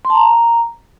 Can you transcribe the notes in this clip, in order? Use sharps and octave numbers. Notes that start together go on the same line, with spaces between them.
C6
A5
A#5